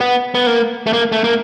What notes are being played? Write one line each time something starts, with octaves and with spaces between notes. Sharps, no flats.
B3
B3
A#3
A3
A#3
A3
A#3